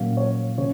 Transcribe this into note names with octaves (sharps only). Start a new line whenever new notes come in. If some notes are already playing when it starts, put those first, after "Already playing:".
Already playing: A#2 F#3 A#3 C#4 F5
C#5
C#3 C#5